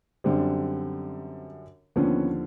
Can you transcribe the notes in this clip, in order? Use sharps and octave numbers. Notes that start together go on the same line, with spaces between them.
F#2 D3 G3 C4
D#2 D3 F3 B3 C#4